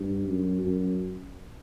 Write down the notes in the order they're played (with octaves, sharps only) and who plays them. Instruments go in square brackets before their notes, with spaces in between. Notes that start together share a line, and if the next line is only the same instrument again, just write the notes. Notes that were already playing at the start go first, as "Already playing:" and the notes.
Already playing: [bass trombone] G2
F#2
F#2